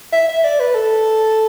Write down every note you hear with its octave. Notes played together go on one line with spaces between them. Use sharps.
E5
E5
D5
B4
A4